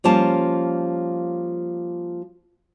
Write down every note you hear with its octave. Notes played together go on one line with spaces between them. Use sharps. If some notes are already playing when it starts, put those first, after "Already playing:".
F3 G3 A#3 C#4 F4 A5